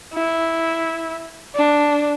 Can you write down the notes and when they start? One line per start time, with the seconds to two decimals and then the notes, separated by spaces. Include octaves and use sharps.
0.14 E4
1.55 D4